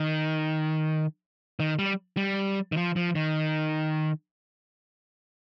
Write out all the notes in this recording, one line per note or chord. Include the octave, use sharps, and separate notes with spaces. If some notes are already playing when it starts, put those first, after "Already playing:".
Already playing: D#3
D#3
G3
G3
D#3
F3
F3
D#3